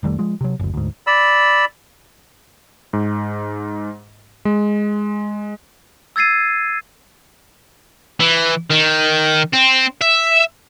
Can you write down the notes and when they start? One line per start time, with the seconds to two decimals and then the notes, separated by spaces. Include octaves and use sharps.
0.03 F1 D#3 G3 A3
0.19 F3 G#3
0.41 C3 F#3
0.59 F#1 D2
0.74 D2 G#2
1.07 D5 B5 E6
2.93 G#2
4.45 G#3
6.16 E6 G#6 A6 C7 D#7
8.20 E3
8.70 D#3
9.54 C4
10.01 E5